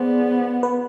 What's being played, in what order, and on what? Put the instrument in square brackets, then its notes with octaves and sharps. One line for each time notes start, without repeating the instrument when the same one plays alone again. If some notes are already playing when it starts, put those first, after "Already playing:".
Already playing: [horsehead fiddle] B3 [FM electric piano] G#4 C5 D5
[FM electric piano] B4